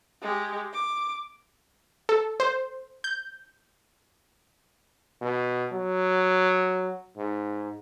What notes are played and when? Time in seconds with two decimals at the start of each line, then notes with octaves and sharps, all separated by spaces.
0.22 G#3 G4
0.73 D6
2.09 A4
2.40 C5
3.04 G6
5.22 B2
5.72 F#3
7.17 G#2